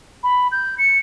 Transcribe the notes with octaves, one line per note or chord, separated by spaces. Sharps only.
B5
G6
C#7